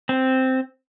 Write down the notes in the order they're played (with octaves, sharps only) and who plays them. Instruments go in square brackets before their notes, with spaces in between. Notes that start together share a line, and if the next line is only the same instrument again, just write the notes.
[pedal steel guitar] C4